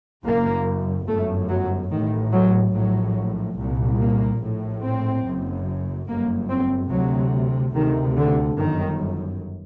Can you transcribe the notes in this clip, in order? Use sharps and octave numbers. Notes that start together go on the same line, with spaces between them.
F#1 F#2 A#3
G1 F#2 A3
F#3
A1 A2 D#3
F#3
A#1 A2 F#3
C2 A#2
A#3
A#1 A2
C4
F#1 F#2
G1 F#2 A#3
C4
D2 C3 F#3
D2 C3 D#3
D3
G1 F#2 D#3